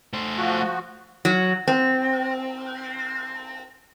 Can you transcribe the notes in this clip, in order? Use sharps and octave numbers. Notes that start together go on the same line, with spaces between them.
A3 C5
F3 F#4
F#3
C4